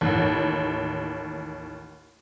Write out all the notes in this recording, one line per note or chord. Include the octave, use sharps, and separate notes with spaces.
A1 D#2